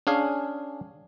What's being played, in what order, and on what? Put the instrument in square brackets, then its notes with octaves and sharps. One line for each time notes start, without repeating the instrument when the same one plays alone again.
[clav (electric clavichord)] C#4 D4 G#4 F5